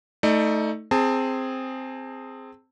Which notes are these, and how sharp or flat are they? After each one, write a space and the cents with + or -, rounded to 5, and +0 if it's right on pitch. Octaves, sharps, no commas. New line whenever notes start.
A3 +0 D#4 +25 D5 +30
C4 +0 G#4 +0 A5 +30